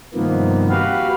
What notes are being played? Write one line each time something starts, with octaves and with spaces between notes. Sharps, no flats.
G2 C3 D#3 F3 A#3 B3
F#4 G4 B4 F5